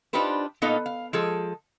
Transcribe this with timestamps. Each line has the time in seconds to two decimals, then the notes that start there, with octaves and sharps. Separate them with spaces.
0.13 D4 D#4 F4 G4 B4 C5
0.62 A#2 B3 D#4 A4 D#5 F5
0.86 F5
1.13 F3 G#3 G#4 A4